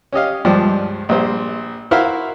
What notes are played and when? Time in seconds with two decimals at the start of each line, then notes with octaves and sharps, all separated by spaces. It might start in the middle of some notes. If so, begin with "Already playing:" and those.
0.12 C#4 G4 D#5 F5
0.45 C#2 G2 F3 G3
1.09 A#1 G3 C5
1.91 E4 F#4 A#4 C5 E5 F5